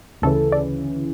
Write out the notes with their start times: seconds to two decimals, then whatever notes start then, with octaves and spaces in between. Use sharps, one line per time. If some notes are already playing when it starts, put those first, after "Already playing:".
0.22 D2 C#3 E3 A4
0.52 D5